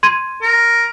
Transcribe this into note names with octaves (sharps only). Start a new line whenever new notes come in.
C6 G#6 D#7
A#4